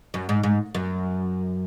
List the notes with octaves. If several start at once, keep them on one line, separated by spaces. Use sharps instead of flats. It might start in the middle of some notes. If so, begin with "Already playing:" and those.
F#2
G#2
G#2
F#2